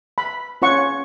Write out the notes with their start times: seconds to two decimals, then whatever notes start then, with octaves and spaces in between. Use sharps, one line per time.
0.18 B5
0.62 C#4 F4 C#5 F#5 C#6